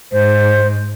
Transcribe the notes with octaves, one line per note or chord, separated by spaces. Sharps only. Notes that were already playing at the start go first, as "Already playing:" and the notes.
G#2 C5